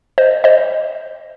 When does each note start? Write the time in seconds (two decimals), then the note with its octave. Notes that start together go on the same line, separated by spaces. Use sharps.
0.18 C5 D#5
0.44 C5 D#5